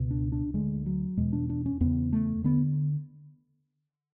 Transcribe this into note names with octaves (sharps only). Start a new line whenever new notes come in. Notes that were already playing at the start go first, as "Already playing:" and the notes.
Already playing: C#2 B2
D4
D4
D2 D3 G#3
F#3
E2 B2 G#3
D4
D4
C#4
E2 C#3 B3
A3
D3 B3